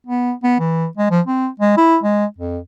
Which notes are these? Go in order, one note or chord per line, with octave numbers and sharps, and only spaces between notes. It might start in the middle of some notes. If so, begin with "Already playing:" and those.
B3
B3
E3
G#3
F3
C4
G#3
E4
G#3
F2